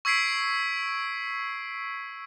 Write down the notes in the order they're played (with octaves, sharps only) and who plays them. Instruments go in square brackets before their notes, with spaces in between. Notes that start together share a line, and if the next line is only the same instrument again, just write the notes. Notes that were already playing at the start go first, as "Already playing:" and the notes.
[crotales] C#6 E6 G#6 B6 C7 D7